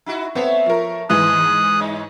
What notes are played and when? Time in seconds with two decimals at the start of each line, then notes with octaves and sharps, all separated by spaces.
0.06 D#4 E4 F#4
0.35 A3 B3 C4 C#5 E5
0.66 F3 A#4
1.10 D#2 G#2 E3 D#6 F#6
1.80 D#4 C#5 D#5